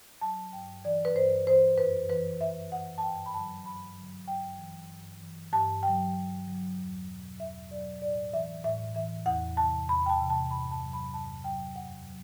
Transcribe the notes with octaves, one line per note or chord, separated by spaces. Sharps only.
F#3 A5
G2 G5
E3 D5
B4
G2 C5
E3 C5
F#2 B4
E3 B4
F#2 E5
E3 F#5
A5
G2 G5
B5
D3 F#3 A5
G2 B5
D3 F#3
G2 G5
E3
G2
E3
G2 A5
D3 F#3 G5
G2
D3 F#3
E2
B2 F#3
E2 E5
B2 F#3 D5
A2 D5
E3 E5
A2 E5
E3 E5
E2 F#5
C3 E3 A5
E2 B5
G5
A5
C3 E3
A5
G2 B5
A5
F#3
B5
G2 A5
F#3 G5
F#2 F#5
F#3